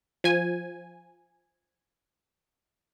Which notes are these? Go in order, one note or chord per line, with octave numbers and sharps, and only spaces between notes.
F3 G#5